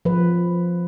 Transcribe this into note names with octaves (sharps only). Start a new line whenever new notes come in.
F3 B4